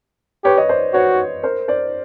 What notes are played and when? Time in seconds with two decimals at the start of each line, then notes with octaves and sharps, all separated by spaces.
0.44 G4 B4 C#5
0.57 C#5 D#5
0.69 C5 D5
0.94 F#4 B4 C#5
1.43 A#4 C5
1.68 C5 D5